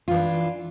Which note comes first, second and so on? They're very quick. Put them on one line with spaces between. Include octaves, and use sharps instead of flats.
F4 E3 D4